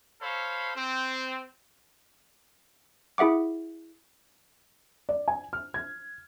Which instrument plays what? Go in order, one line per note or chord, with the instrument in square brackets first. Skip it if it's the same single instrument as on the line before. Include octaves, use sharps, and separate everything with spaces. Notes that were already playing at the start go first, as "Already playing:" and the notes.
[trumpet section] A4 C5 C#5 F5 B5
C4
[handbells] E4 G#4 E5 F#5 D6
[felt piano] D5
G#5
F6
G#6